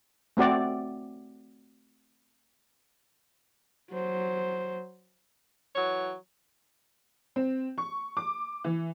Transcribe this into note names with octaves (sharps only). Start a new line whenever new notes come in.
A3 C4 F#4 D5
F#3 C5
E3 F#3 C#5
C4
C#6
D6
E3